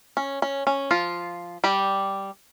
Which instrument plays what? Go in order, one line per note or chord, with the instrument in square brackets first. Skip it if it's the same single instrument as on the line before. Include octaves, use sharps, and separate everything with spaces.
[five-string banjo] C#4
C#4
C#4
F3 F4
G3 G4